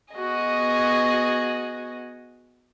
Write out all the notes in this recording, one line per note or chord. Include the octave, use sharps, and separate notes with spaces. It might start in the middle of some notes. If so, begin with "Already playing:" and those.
B3 F#4 G#4 D#5